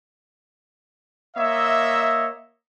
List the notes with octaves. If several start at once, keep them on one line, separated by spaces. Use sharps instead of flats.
A#3 C#5 D#5 E5